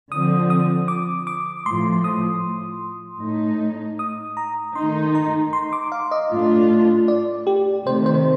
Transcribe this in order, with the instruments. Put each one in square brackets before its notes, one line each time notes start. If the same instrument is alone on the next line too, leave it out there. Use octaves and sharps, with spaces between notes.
[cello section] D3 F3 C4 [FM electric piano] D#6
[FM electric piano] D#6
D6
D6
[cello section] A2 F3 A3 [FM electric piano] C6
[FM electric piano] D#6
[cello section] A2 A3 D#4
[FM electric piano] D#6
A#5
[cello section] D#3 A3 D#4 [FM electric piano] C6
[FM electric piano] A#5
C6
D6
F5
D#5
[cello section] A2 A3 D4 F4
[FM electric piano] D5
G4
[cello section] C3 D#3 A3 [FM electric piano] C5
[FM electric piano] C5